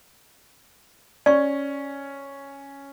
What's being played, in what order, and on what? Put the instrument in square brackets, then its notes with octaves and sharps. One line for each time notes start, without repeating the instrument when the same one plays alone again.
[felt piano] C#4 [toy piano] D5 C#6